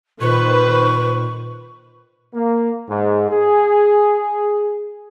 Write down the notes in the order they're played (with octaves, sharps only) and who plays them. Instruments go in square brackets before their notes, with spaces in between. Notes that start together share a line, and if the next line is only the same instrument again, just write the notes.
[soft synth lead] A#2 [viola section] D#3 B4 C5 [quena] C#6
[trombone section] A#3
G#2
G#4